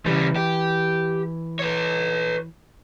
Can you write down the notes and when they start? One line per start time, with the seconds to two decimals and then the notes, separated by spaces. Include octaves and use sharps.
0.06 C#3 E3 G3
0.36 G4
1.59 B4 C#5